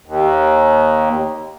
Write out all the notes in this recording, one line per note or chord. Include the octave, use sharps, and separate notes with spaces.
D#2